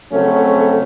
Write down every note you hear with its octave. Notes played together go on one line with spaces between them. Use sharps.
F2 C#3 F#3 A3 C4 C#4